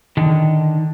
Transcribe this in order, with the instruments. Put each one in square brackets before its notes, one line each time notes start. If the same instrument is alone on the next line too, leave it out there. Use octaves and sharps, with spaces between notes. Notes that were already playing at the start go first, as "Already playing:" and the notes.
[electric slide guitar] D3 D#3